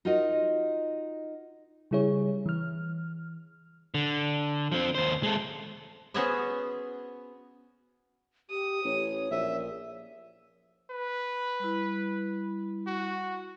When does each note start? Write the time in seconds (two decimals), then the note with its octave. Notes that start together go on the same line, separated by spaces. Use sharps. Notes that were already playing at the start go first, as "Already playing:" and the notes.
0.05 D#4 F4 F#4 A#4 D#5
1.91 C#3 G3 E4 G#4 C#5
2.46 E3 F6
3.94 D3
4.72 F3 C4
4.95 D#2 C5
5.23 G#3 A4
6.14 B3 C#4 F#4 G#4 C5 E5
8.50 G4 D#6
8.85 A1 C#5
9.31 A#1 E5
10.90 B4
11.60 G3 E4
12.87 F#4